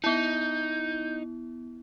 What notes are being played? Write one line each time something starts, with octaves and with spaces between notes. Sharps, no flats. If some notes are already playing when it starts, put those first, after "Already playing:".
B3 D#4 E4 G6